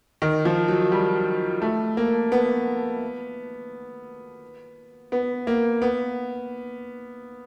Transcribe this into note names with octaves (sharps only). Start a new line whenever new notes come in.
D#3
F3
F#3
G3
A3
A#3
B3
B3
A#3
B3